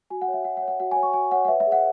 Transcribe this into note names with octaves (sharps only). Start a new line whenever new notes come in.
F#4 G#5
F#5
C#5
E5
F#4 F#5
F#5
C#5
F#5
F#4 F#5
C#5 G#5
C#6
F#4 G#5
C#5 F#5
F#5
B4 E5
E5
G#4
F#5